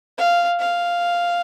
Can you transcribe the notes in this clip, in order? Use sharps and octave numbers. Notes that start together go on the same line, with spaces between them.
F5
F5